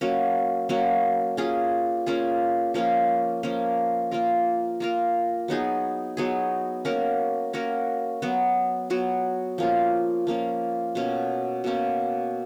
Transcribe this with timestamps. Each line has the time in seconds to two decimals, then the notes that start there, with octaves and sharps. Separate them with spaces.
0.01 F#3 A#3 C#4 F#4
0.69 F#3 A#3 C#4 F#4
1.37 A#3 C#4 F4 G#4
2.06 A#3 C#4 F4 G#4
2.74 F3 A#3 C#4 F4
3.43 F3 A#3 C#4 F4
4.11 A#3 F4 A#4
4.80 A#3 F4 A#4
5.48 F#3 B3 D#4 G#4
6.17 F#3 B3 D#4 G#4
6.85 A#3 C#4 F#4 A#4
7.53 A#3 C#4 F#4 A#4
8.22 F#3 B3 F#4
8.90 F#3 B3 F#4
9.58 F3 A#3 C#4 F4
10.27 F3 A#3 C#4 F4
10.95 B2 A#3 C#4
11.64 B2 A#3 C#4